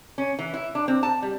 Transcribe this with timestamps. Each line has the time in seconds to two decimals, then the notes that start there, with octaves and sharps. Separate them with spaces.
0.18 C#4
0.39 E3
0.54 E4
0.75 D4
0.88 C4
1.03 A5
1.22 G3